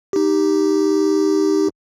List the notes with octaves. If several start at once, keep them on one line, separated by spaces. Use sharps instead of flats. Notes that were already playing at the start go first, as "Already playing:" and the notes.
D#4 G4